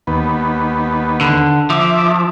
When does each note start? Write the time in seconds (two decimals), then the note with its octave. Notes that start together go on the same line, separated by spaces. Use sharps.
0.07 D#2 B3
1.21 D3
1.70 F3 E5 D6